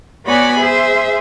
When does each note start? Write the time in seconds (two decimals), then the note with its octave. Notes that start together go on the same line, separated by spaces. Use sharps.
0.24 B3 F#4 C#5 D5 G#5 B5
0.58 G#4 C5 E5